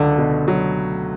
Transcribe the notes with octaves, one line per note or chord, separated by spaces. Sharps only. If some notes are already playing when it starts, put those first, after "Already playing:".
Already playing: C#2 D3 F#3 A3
B2
F#3